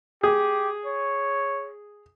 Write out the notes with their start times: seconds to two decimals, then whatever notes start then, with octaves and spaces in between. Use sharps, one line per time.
0.23 G4 G#4
0.86 C#5